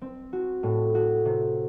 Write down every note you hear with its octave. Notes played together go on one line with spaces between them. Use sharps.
C4
F#4
A2
F#4
C3